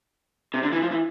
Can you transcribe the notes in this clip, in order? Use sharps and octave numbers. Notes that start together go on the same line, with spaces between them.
C3
D3
E3
F3
E3